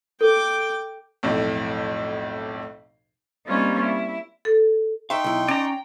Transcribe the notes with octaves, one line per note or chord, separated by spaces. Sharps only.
A4 G5 D6
B1 F2 A2
G3 A#3 C4 C#4 D#4 F4
E4
A4
D#4 E5 F5 G5 C6 C#6
B1 E4
C#4 D5 A#5